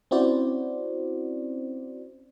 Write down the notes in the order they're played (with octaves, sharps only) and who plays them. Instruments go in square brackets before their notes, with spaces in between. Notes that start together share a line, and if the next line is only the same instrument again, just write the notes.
[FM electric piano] C4 C#4 E4 F#4 C5 D5